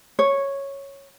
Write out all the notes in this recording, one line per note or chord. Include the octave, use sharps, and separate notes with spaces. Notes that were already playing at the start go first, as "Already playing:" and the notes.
C#5